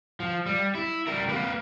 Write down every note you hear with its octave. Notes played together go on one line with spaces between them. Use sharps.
F3
G3
E4
G3 A#4
A#3 B4